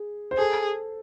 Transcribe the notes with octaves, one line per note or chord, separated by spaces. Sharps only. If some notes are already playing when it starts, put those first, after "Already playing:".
Already playing: G#4
C5
G#4 A4